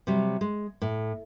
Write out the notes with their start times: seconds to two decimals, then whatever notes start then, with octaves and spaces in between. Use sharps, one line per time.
0.07 C3 F#3 G3
0.41 G#3
0.82 A2